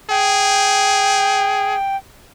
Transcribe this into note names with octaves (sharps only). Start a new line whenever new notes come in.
G#4 G5